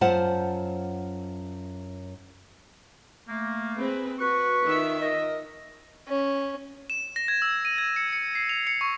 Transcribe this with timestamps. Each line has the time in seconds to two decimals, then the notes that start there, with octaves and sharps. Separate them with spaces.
0.01 F#2 F4 C5 F#5 A5
3.28 A3 A#3
3.76 C4 G#4 B4
4.19 F#4 B4 C#6
4.63 D#3 F4 E5
5.01 A#4 D#5
6.07 C#4
6.90 E7
7.16 A#6
7.28 G#6
7.42 E6
7.65 D#7
7.78 G#6
7.96 C#7
8.13 C#7
8.35 C7
8.49 F7
8.67 C#7
8.81 C#6